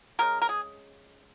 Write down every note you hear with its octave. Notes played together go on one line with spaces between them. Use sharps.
C#3 G#3 A#4
A#4
G#4